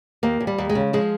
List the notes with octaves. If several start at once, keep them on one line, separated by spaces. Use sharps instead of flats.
D#2 A#3
D#2
G3
D#2
G#3
C#3
F3 G#3